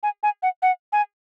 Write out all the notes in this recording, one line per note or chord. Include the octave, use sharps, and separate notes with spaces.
G#5
G#5
F#5
F#5
G#5